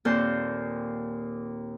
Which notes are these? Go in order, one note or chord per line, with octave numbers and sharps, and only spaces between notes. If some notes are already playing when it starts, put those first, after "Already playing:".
D#2 A#2 C4 A4 C5 G6